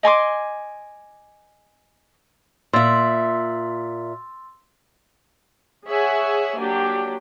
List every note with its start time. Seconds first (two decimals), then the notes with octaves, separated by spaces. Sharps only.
0.03 D#5 G#5 C6 D6
2.73 A#2 E5 C6 E6 A6
5.86 G#4 C#5 E5 F#5 G#5
6.58 F#3 A#3 D4 G4